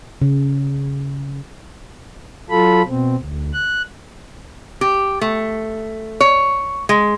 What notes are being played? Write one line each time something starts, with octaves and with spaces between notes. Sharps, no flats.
C#3
F#3 F4 A4 B5
B2 C4
D2
F#6
G4
A3
C#5
G#3